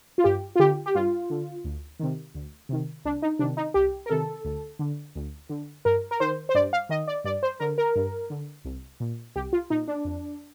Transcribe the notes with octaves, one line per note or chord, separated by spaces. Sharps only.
F4
G2 G4
F4
D3 G4
G4
G2 F4
D3
D2
C3 D#3
D2
C3 D#3
C2 D4
D#4
C3 D#3 D4
D#4
C2 G4
A#4
C3 D#3 A4
D2
D3
D2
D3
G2 A#4
A#4
D#3 C5
C5
G2 D5
F5
D#3 D#5
D5
G2 D5
C5
D3 A#4
A#4
G2
D3
C2
A#2
C2 G4
F4
A#2 D#4
D4
F2